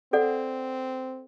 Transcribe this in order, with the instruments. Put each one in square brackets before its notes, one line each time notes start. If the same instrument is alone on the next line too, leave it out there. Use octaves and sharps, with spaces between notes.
[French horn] C4 [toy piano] A4 D5 F#5